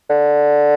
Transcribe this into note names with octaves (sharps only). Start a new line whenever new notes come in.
D3